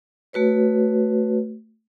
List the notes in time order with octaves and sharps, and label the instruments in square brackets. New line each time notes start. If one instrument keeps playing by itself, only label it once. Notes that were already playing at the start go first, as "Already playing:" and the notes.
[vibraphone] A3 F#4 B4 C#5